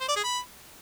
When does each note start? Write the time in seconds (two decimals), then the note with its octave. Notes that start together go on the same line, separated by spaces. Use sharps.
0.01 C5
0.08 D5
0.16 G#4
0.24 B5